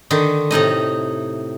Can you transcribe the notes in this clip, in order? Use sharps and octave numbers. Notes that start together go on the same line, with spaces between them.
D3 D#3 D#4
A2 C3 D#4 D#5